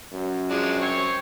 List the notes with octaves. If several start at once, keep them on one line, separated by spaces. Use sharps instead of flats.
F#2
F3 G#3 D4
C4 C#5